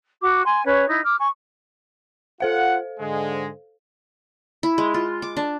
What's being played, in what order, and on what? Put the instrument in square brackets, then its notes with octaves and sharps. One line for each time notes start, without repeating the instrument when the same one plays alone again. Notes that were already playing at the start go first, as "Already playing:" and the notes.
[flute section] F#4 D6
G#5 C6
C#4 B4 C#5
D#4 E4
D6 F6
G#5 C#6
[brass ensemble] F4 F#5 [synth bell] A4 C5 F5
[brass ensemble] G#2 D3 G#3
[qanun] E4
G#3
F4
D6
D4